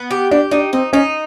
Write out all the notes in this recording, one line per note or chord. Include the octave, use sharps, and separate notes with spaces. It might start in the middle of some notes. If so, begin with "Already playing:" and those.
Already playing: B3
G4
D4 G4
D4 D#4
C4 D#4
C#4 D#4